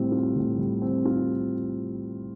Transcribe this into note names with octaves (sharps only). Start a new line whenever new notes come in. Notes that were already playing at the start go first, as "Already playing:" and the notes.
Already playing: A2 G3 C4
F4
A2
G3
C4
F4